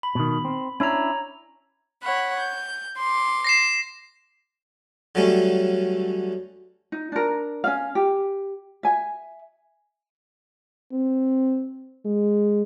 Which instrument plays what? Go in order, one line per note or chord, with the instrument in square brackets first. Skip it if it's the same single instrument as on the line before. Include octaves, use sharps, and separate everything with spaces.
[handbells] B5
[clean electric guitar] B2 D#3
C4
[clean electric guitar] C#4 D4 E4 [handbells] C#5 A#5
[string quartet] C#5 F#5 B5
G6
C6 D6
[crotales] A#6 C7 E7
[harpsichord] D3 F#3 G3 A3 C#4
[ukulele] D#4
D4 A#4
C#4 F5
G4
E5 G#5
[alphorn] C4
G#3